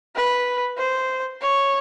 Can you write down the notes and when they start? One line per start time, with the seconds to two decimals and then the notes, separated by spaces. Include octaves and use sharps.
0.15 B4
0.78 C5
1.41 C#5